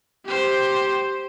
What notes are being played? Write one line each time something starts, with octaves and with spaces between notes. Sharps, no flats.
G4 C5